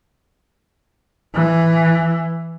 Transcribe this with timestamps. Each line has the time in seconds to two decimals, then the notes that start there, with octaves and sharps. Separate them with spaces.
1.34 E3